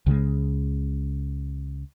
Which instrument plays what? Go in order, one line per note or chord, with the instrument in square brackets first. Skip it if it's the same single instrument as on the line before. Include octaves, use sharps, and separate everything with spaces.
[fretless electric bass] C#2 C#3 F#3 G#3